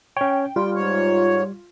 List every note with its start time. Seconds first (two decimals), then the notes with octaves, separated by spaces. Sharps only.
0.17 C#4 C#5 G5
0.56 G3 F4 G5
0.75 G#2 C#5